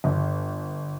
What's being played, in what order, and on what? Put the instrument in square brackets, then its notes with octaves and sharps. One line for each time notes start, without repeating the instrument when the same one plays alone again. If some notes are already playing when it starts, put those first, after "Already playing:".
[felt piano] G1